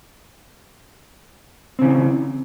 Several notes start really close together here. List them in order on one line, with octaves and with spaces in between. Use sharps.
C4 C#3 E3